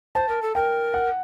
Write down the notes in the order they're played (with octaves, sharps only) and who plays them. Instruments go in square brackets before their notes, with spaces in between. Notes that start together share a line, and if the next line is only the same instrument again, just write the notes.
[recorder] C5 [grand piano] A5
[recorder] A#4
A4
[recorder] A#4 [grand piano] G5
[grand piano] F#5